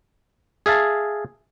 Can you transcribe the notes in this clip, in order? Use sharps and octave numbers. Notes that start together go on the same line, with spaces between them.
G#4 E5 F5 A5